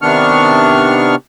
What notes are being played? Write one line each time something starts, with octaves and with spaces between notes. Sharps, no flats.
C3 D#3 B3 D4 C#6 F6